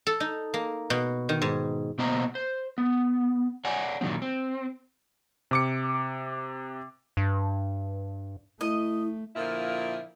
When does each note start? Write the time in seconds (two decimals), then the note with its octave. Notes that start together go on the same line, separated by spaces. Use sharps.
0.07 A4
0.20 D#4
0.54 A#3
0.90 B2
1.29 D#3
1.42 G#2
1.98 B2 A#3 B3 C5 D#5 A#5
2.35 C5
2.78 B3
3.65 C#5 D5 F#5 G#5
4.01 A#2 D#3 F#3 G#3 C4
4.22 C4
5.51 C3 D6 C#7
7.17 G2
8.61 A3 E4 D#5
9.36 A#2 D3 F3 E4 A#4